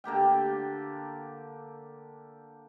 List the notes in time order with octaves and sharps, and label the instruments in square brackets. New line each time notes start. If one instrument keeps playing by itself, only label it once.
[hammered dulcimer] D3 A#3 G4 G5